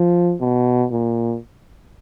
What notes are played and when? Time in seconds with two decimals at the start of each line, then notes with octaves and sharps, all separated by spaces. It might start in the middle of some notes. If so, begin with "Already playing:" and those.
Already playing: F3
0.41 B2
0.91 A#2